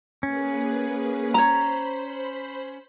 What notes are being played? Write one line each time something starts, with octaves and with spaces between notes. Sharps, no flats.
A#3 C#4 G#4 B4
C5 C#5 A#5 B5